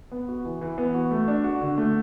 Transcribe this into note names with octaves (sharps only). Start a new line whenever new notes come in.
B3
F#4
E3
E3
B3
F#4
A3
D4
F#4
D3
A3